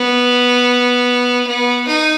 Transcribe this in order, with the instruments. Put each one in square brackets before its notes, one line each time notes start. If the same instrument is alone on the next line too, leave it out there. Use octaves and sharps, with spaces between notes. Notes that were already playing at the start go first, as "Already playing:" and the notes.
Already playing: [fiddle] B3
B3
D#4